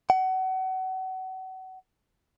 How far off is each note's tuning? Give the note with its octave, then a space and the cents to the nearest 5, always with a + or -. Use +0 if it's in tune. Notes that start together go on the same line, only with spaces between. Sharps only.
F#5 +30